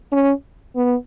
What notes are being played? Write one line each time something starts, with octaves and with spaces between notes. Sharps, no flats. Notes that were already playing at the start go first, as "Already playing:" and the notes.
C#4
B3